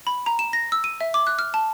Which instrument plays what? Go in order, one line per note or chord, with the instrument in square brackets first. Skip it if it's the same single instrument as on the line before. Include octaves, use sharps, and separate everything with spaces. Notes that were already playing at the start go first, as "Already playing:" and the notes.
[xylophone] B5
A#5
E7
A#6
E6
D#7
E5
D6
F#6
F6
A5